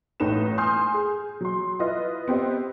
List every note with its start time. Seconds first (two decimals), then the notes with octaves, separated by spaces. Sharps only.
0.20 A1 A2 D#4 B4 E7
0.58 G#5 C6 D#6 F6 G6
0.94 G#4
1.41 F#3 C6
1.79 E4 F4 B4 D#5
2.28 B3 C4 G4 D#5